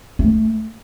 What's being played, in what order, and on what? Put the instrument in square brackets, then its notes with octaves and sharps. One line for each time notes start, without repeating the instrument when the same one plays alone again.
[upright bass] A3